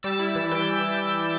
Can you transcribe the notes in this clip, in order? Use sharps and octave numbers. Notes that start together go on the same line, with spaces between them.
G3 E6 A6
E4
E3
E3 D6 G6